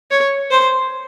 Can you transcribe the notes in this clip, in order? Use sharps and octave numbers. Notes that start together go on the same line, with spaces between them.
C#5
C5